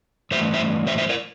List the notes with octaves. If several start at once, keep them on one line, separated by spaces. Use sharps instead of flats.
G2 E3 A3 C5 E5
C5 E5
C5 E5
C5 E5
A#4 D5